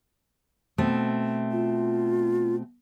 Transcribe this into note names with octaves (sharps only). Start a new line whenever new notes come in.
B2 A3 C4
F4